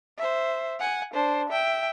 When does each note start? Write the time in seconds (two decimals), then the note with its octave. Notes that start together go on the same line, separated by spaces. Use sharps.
0.18 C5 E5
0.80 F#5 G#5
1.14 D4 C5
1.49 E5 G5